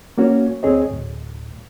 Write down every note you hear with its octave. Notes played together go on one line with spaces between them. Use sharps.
A#3 C#4 F#4 C#5
D2 C4 G#4 C#5 D#5
D2 A2